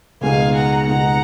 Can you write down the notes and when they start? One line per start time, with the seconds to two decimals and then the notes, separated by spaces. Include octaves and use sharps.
0.21 C#2 B2 G#3 D#4 F5 G#5
0.54 F#5 A#5
0.87 C#2 B2 G#3 D#4 F#5 A#5